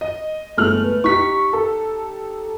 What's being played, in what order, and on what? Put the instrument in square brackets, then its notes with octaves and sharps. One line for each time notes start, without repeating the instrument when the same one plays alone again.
[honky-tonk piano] D#5
[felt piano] G1 G#3 [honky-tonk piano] A3 F6 F#7
[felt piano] B4
[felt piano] D#4 G4 [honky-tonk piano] C#6 B6
[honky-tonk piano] A4